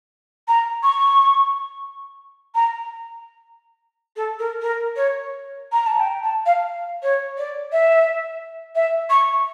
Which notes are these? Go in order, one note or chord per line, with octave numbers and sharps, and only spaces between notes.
A#5
C#6
A#5
A4
A#4
A#4
C#5
A#5
A5
G5
A5
F5
C#5
D5
E5
E5
C#6